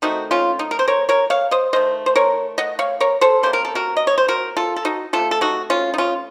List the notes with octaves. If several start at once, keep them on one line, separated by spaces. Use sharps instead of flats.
D#3 A3 C4 D#4 F#4
C#4 F4
D#4
A#4
C5
A#4 C#5
A#4 C#5
C#5 F5
C5 D#5
D#3 A3 C#4 C5 D#5
C5
A#4 C#5
D#5 F#5
C#5 F5
A#4 C#5
A4 C5
C3 F#3 A#3 C#4 C5
A#4
A4
F#4 A#4
D#5
C#5
C5
F#4 A#4
F4 A4
A4
D#4 F#4
C3 F#3 A3 F4 A4
A4
D#4 F#4
C#4 F4
D#4
C#4 F4